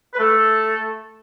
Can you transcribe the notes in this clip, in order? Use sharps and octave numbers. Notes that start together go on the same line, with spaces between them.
B4
A3 A4